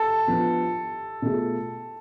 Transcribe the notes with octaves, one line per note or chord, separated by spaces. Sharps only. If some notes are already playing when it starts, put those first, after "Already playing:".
Already playing: A4
F3 B3 D4 F4
B2 A3 F4 G#4